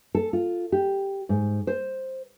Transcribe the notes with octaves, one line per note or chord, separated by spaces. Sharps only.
A4
F4
G4
G#2
C5